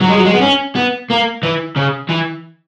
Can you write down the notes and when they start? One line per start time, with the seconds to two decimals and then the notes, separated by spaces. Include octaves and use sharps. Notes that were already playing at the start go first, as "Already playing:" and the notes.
0.02 F#3
0.10 G#3
0.18 F#3
0.26 G#3
0.35 B3
0.42 C#4
0.76 B3
1.10 A#3
1.43 E3
1.76 C#3
2.09 E3